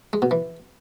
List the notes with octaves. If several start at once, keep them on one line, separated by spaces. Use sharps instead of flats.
G#3
B2
E3